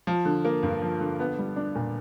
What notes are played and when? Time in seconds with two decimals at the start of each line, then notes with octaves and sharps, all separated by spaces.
0.07 F3
0.25 D3
0.45 A#3
0.63 G2
0.82 F3
1.01 D3
1.20 B3
1.38 G3
1.56 D4
1.76 A#2